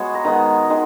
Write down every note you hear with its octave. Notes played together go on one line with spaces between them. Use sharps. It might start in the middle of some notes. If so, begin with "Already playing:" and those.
Already playing: G#3 B3 F#4 C#5
A#5
D#3 G#3 B3 A#5
D#3 G#3